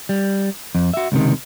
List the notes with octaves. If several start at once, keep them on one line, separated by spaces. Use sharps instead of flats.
G3
F2
F#4 E5
C#2 C3 D#3